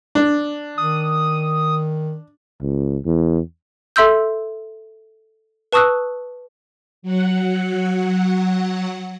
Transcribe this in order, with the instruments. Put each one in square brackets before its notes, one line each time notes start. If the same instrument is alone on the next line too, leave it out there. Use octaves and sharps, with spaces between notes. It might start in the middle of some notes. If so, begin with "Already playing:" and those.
[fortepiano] D4
[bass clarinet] D#3 [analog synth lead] D#6
[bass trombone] C#2
E2
[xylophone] A4 E5 C6 E6 G6
B4 A5 C#6 D#6 E6 F#6
[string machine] F#3 F#5